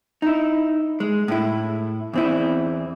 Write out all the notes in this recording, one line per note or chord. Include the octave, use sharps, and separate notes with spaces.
D#4 E4
G#3
A2 E4
E2 C4 E4